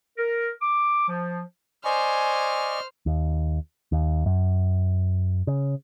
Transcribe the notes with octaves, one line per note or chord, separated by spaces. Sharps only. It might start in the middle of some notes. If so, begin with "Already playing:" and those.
A#4
D6
F3
C5 D5 D#5 G#5 C#6 F6
D#2
D#2
F#2
C#3